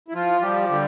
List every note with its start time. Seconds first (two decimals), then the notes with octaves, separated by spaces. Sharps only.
0.08 E4
0.14 F3 F4
0.41 F3 G3 G4
0.69 D3 G3 G4